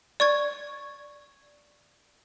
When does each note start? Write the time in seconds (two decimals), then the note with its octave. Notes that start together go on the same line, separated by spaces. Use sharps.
0.20 D5 C#6 G#6